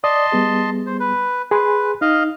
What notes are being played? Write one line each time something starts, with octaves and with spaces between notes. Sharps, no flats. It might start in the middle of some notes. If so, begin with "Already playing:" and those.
D5 D#5 A5 C6 D#6
G3 B3 G#4
C5
B4
G#4 B4 C6
D#4 D#5 F5